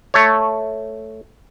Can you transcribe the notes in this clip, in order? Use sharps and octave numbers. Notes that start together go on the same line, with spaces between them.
A3 C#5